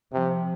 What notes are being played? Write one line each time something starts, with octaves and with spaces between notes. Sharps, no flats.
C3 F3